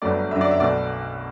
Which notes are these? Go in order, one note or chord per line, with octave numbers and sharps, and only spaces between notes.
G1 G2 F#3 A3 D5
F#2 D3 F#3 E5
D5
E5
B1 B2 A3 D5